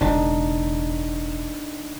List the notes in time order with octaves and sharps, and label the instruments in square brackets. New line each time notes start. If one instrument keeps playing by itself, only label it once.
[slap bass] E1 C#3 [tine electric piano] D4 D#4